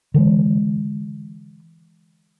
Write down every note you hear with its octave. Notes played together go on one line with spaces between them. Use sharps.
D3 E3 G3 G#3